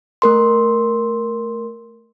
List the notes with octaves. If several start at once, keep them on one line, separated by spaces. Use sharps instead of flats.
A3 A#4 C6